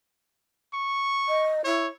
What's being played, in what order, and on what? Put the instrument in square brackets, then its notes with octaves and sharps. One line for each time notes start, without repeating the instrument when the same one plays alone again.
[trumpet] C#6
[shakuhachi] D#5
[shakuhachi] E4 [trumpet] C#5